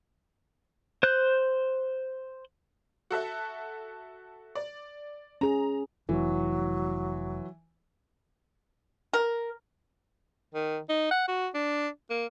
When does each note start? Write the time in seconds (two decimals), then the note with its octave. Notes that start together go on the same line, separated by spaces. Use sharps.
1.03 C5 F#6 G6
3.11 F#4 A4 E5
4.55 D5
5.41 C#4 G#4 A#5
6.09 F1 E3 F#3
9.13 A#4
10.54 D#3
10.89 D#4
11.11 F#5
11.28 F#4
11.54 D4
12.10 A#3